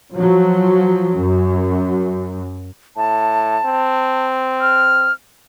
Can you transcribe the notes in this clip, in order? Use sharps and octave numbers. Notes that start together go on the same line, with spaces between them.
F3 F#3
F#2
A2 A5
C4
F6